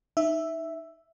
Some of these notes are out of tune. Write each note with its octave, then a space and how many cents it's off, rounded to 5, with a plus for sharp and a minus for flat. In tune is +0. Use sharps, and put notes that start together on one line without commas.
D#4 +0 E5 +0